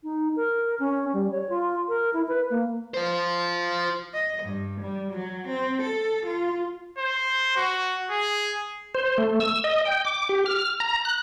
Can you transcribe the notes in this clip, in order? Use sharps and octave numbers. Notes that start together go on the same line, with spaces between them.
D#4
A#4
C#4
G3
C#5
F4
A#4
E4
B4
A#3
F4 C5
D#5
G2
G3
F#3
C4
A4
F4
C5
F#4
G#4
C5
A3
E6
D#5
G5
D6
G4
F6
A#5
F#6